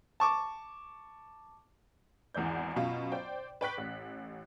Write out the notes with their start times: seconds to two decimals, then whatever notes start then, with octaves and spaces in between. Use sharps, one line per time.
0.20 A5 C#6 D6
2.34 G#1 E2 E3 D5 G6
2.76 F#2 B2 F4
3.12 C5 D5 G5
3.61 B4 D5 G5 C#6 F#6 B6
3.78 A1